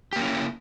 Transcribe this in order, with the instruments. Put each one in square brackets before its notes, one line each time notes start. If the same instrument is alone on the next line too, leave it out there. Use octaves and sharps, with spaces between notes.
[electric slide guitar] G4
A#3
C#4
E4